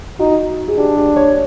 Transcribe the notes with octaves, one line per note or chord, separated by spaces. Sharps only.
D#4 F#4
G#4
D4 G4
G4
C#5